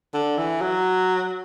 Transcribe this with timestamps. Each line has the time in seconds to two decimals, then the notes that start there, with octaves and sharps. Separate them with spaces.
0.14 D3
0.37 E3
0.62 F#3